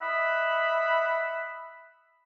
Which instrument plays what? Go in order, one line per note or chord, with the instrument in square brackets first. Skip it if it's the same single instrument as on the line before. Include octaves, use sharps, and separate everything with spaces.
[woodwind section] D#5 E5 F#5 B5